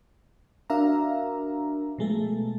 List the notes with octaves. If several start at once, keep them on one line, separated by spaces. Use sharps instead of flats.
D4 F#4 A#4 E5 F5 A#5
B2 F3 G#3 A3 A4